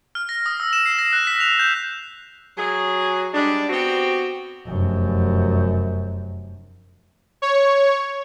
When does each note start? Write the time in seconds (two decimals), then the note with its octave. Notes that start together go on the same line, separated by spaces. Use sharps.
0.15 F6
0.29 A#6
0.46 D#6
0.60 E6
0.73 E7
0.86 C7
0.98 A#6
1.13 F#6
1.27 B6
1.40 F7
1.59 G6
2.57 F#3 G#4
3.33 G3 G#3 D4
3.69 B3 C4 F#4 G4
4.66 F1 F#2
7.42 C#5